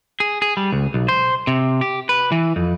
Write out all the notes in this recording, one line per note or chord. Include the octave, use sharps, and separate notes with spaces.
G#4
G#4
G3
C#2
B1
C5
C3
G4
B4
E3
F2